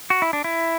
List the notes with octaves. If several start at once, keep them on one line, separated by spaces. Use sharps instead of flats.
F#4
E4
D4
E4